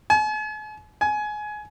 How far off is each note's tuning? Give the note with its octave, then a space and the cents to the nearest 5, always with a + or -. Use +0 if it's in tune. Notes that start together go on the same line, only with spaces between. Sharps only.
G#5 +45
G#5 +20